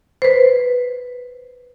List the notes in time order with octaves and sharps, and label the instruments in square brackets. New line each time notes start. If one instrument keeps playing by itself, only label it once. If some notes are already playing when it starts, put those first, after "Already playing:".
[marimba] B4 C5